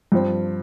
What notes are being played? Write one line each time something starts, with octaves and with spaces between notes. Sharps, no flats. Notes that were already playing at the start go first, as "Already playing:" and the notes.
G2 F3 C4